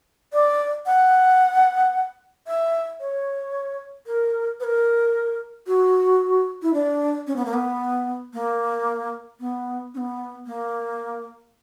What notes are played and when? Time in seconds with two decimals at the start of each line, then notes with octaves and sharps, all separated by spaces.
0.33 D5
0.86 F#5
2.47 E5
3.01 C#5
4.07 A#4
4.60 B4
4.64 A#4
5.67 F#4
6.63 E4
6.74 D4
7.27 C#4
7.36 B3
7.45 A#3
7.53 B3
8.34 A#3
9.40 B3
9.94 C#4
9.98 B3
10.47 A#3